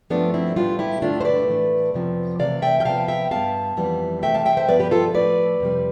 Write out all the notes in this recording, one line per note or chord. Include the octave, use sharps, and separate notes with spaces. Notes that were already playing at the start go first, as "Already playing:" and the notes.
G2 F3 A3 B3 D4
C4 E4
A2 G3 B3 D4 F4
E4 G4
G2 D3 A3 D4 F4
C5
B4 D5
A2 E3 A3
F2 C3 F3 B3
C3 E3 A3 D5 F5
E5 G5
G5
C3 F3 B3 F5 A5
E5 G5
G2 F3 B3 F5 A5
F2 E3 G3 B3
C3 E3 A3 E5 G5
F5 A5
E5 G5
C5 E5
G2 F3 B3 B4 D5
G4 B4
F4 A4
A2 F3 A3 B4 D5
F2 C3 G3